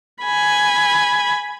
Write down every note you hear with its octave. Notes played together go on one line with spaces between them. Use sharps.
G#5 B5